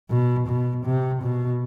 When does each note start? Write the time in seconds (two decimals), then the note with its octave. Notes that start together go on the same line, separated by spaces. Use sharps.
0.10 B2
0.48 B2
0.85 C3
1.22 B2